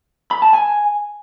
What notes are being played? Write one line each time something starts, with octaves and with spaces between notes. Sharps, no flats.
B5
A5
G#5